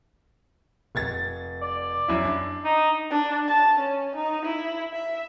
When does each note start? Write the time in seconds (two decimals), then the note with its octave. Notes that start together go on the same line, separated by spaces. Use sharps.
0.95 F1 G#6 A6
1.62 D5
2.08 F#2 E4
2.25 D4
2.65 D#4
3.11 D4
3.48 A5
3.79 C#4
4.16 D#4
4.46 E4
4.93 E5